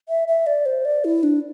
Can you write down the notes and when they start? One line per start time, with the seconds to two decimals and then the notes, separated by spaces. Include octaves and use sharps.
0.09 E5
0.28 E5
0.47 D5
0.66 C5
0.85 D5
1.05 E4
1.23 D4